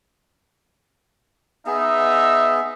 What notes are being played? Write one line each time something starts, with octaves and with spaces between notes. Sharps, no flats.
B3 D#4 G#4 E5